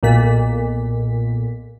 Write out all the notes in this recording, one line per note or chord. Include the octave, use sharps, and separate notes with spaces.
B1 A#2 B6